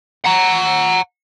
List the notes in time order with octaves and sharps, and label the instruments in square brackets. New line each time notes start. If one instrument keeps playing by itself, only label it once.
[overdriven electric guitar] F#5 A#5